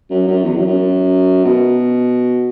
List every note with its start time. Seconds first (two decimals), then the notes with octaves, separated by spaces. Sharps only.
0.10 F#2
0.28 F#2
0.44 E2
0.55 F#2
0.66 F#2
1.45 B2